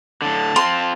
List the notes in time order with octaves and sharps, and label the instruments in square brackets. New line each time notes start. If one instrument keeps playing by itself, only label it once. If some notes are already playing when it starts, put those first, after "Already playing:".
[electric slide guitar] A2 D3 [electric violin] A5
[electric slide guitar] C4 F4 [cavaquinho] C6